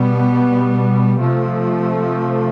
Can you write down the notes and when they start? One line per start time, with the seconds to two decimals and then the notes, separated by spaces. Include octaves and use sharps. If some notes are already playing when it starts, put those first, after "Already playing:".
Already playing: B2 G3 B3
1.20 C3 F3 A3